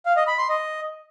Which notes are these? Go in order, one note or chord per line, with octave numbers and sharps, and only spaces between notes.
F5
D#5
B5
C6
D#5